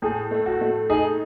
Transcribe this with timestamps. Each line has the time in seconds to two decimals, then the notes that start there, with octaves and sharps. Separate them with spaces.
0.02 A2 G#4
0.31 A3
0.46 F#4
0.61 A3
0.89 D#4 G#4